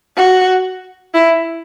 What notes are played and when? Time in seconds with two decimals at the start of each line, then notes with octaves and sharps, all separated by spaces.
0.17 F#4
1.14 E4